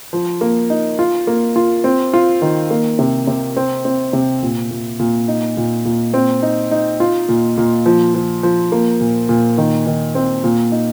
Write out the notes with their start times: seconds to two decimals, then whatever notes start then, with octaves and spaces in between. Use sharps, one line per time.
0.13 F3
0.41 A#3
0.70 D#4
0.99 F4
1.27 A#3
1.56 F4
1.84 C4
2.13 F4
2.42 D#3
2.70 A#3
2.99 C3
3.27 C3
3.57 C4
3.85 C4
4.13 C3
4.43 A#2
4.71 A#2
4.99 A#2
5.28 D#4
5.57 A#2
5.85 A#2
6.14 C4
6.42 D#4
6.71 D#4
7.00 F4
7.29 A#2
7.57 A#2
7.86 F3
8.15 F3
8.43 F3
8.72 A#3
9.00 A#2
9.29 A#2
9.58 D#3
9.87 D#3
10.15 C4
10.44 A#2
10.72 D#4